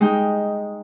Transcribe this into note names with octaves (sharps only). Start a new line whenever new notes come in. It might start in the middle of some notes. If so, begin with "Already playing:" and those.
G#3 D#4 G5